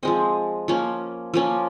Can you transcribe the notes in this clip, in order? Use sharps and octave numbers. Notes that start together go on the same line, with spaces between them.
F3 G#3 C4 D#5
F3 A#3 C#4
F3 A#3 C#4